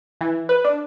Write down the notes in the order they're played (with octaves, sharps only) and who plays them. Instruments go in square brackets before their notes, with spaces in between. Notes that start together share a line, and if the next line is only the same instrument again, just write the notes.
[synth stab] E3
B4
D4